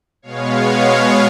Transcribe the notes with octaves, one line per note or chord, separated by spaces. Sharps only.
B2 G#3 B3 C#5 F5